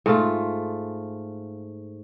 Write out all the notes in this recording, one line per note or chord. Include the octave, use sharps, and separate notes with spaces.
G#2 A3 F4